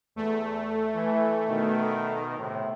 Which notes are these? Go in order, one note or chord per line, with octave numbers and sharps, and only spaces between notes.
E2 A3
E3
B2 D#3
A2 C3